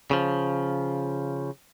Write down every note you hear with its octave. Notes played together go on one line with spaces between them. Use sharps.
C#3 F3